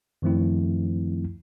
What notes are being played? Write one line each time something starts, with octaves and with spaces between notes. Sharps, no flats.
F#2 D#3 F3 A3 C4 E4